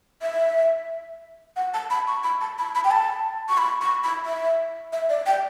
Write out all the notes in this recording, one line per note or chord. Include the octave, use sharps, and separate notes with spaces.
E5
F#5
A5
B5
C#6
B5
A5
B5
B5
G5
A5
C#6
B5
C#6
B5
E5
E5
D5
G5